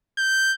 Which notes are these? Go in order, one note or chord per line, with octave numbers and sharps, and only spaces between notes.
G6